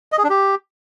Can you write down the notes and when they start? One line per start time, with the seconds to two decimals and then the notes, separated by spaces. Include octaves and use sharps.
0.12 D#5
0.18 G#4
0.24 D4
0.30 G4